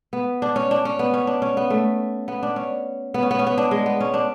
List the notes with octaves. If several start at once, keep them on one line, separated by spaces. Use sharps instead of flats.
B3
D4
C#4
D4
C#4
B3
C#4
D4
C#4
B3
A3
B3
D4
C#4
B3
C#4
B3
C#4
B3
D4
G#3
B3
C#4
D4